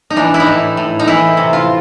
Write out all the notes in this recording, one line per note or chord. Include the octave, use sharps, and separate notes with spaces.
D#4
E3 D4
E4
D#4
A2
A2
D#4
E3 E4
C3
F4